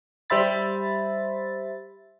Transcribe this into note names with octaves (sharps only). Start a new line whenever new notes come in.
G3 C5 E5 B5 A6